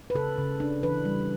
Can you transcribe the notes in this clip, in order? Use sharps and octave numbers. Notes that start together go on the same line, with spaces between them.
B4
C#3 A4
C#3
D4
E3 B4
G3